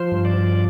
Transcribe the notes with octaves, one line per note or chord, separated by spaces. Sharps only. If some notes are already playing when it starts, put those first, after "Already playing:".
Already playing: F3 C5
G2
D5
F3